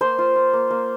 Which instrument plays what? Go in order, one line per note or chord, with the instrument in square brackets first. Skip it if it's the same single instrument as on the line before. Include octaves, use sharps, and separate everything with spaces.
[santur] A#3 C5 C6
F4
F4
A#3
A#3